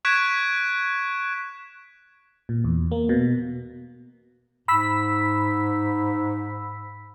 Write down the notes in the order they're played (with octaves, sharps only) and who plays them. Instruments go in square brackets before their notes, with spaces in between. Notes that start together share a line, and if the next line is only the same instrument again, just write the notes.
[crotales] C#6 F#6 G#6 B6 D7 E7
[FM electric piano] A#2
E2
A#3
B2
[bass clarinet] G#2 [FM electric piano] B5 E6 B6